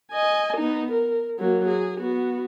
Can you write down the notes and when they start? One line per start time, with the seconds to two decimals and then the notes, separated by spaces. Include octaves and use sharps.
0.12 D#5 G#5
0.57 B3 D#4
0.92 A#4
1.40 F#3 A#3
1.68 G#4
2.00 B3 F#4